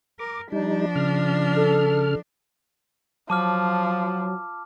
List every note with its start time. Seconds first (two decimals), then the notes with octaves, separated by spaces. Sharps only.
0.19 A#4 D6
0.52 F3 G3 D4 D#4
0.95 C#3 F6
1.55 A4
3.30 F3 F#3 A5 D6 F6